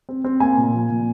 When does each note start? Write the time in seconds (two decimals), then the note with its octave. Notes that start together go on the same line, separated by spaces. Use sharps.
0.09 C4
0.24 C4
0.40 A#3 G#5
0.57 A#2
0.73 F3
0.90 A#2